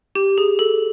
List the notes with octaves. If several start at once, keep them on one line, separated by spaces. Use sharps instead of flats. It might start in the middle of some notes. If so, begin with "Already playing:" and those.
G4
G#4
A4